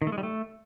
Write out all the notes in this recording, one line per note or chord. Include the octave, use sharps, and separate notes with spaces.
D#3
A3
G#3
G3
A3